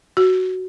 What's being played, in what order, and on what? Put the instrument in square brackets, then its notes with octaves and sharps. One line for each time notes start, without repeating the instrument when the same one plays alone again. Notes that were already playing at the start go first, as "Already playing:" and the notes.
[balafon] F#4